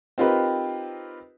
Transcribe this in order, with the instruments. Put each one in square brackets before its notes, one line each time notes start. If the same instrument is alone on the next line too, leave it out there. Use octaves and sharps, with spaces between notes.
[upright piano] C4 D#4 F4 G4 A#4 B4